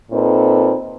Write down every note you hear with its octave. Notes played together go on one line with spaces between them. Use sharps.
A#2 C4 D#4 A4 B4